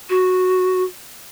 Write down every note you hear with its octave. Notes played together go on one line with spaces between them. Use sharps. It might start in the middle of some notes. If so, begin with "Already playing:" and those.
F#4